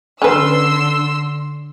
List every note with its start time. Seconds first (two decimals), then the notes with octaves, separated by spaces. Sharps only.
0.22 D3 C#4 B4 C6 E6